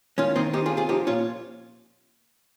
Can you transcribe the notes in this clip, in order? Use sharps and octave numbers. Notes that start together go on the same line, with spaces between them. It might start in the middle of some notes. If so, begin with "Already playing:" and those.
D#3 C#4 F4
D#3 C4 D#4
C4 D#4 G4
F4 G#4
C4
F4 G#4
F3 D#4 G4
A#2 C#4 F4